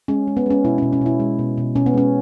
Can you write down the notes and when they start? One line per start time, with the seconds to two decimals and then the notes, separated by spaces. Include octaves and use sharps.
0.08 G#3 C#4
0.27 G#3
0.37 B3
0.46 G#3 C#4
0.64 B2 E4
0.78 B2 C#4
0.93 C#4
1.01 B2 E4
1.20 G#3
1.39 B2
1.58 B2
1.75 B2 C#4
1.86 B3
1.94 G#3 C#4